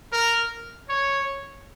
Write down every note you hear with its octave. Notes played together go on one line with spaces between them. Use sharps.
A#4
C#5